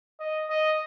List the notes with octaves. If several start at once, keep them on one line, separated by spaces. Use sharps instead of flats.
D#5
D#5